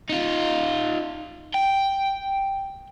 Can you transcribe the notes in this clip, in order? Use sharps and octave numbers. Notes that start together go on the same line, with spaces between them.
D#4 F4
G5